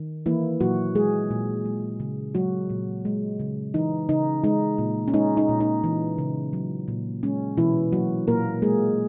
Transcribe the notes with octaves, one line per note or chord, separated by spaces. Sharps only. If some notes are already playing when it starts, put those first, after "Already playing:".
Already playing: D#3
E3 A#3 E4
A#2 F#3 F#4
G#3 G#4
A#2
G#3
C#3
F#3 G#3 F#4
A#2
G#3
C#3
E3 D#4
C#3 D#4
G#3 D#4
A#2
C#4
G#3 D#4
D#4
A#2
D#4
E3
C#3
F#3
A#2
G#3 C#4
B2 E3 E4
F#3 A#3 F#4
A#2 A#3 A#4
G#3 A#3 G#4